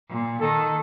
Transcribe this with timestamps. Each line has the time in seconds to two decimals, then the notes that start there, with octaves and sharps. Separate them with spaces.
0.09 A#2
0.40 D#3 A4